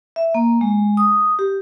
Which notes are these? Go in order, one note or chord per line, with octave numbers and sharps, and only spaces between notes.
E5
A#3
G#3
D#6
G4